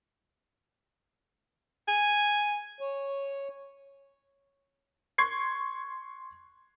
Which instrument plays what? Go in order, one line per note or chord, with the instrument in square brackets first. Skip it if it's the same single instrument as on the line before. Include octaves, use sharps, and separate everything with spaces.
[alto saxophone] G#5
[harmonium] C#5
[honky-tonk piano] C6 C#6 G#6 C7